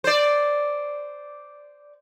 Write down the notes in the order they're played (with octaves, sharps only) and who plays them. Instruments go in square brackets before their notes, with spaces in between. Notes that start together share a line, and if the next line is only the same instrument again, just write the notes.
[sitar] C5 D5